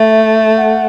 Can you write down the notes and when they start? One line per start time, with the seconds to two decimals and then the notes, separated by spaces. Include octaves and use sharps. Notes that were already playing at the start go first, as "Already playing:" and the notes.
Already playing: A3 E5
0.57 F#5